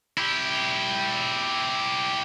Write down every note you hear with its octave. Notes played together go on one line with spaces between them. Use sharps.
E4 G4